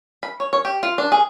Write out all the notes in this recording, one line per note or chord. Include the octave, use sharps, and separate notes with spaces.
B5
C#5
C#5
G4
F4
D4
G#4